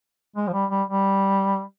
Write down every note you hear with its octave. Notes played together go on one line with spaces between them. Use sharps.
G#3
F3
G3
G3
G3